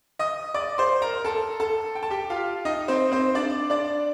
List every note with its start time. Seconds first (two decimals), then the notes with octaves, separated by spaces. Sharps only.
0.19 D#5 D#6
0.54 D5 D6
0.78 C5 C6
1.02 A#4 A#5
1.25 A4 A5
1.60 A4 A5
1.95 G5
2.03 A5
2.10 G4 G5
2.30 F4 F5
2.65 D#4 D#5
2.88 C4 C5
3.12 C4 C5
3.35 D4 D5
3.70 D4 D5